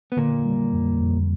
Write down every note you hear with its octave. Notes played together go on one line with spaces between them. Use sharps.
B3
A#2 D3 A#3
G3
F2
F2